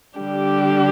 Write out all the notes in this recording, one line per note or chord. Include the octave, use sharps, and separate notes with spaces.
D3 G3 D4 G4